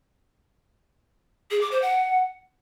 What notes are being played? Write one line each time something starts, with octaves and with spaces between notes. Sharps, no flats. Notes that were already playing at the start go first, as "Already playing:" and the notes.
G#4
D6
C5
F#5